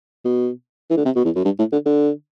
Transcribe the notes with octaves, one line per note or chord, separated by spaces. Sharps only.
B2
E3
D3
C3
B2
E2
F#2
G2
A2
D3
D3